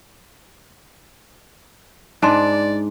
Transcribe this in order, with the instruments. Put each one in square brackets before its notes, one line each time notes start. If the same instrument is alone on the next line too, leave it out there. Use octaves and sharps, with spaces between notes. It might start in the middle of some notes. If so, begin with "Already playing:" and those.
[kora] G#2 D4 [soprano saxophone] D5 [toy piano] D#5 A5 C6